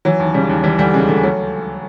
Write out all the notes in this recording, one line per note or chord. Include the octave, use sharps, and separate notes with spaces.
E3 F#3
D#2
C#3 G3
D#2
E3 G3
D2 G3
C#3 G#3
D2 A3
F#3 A3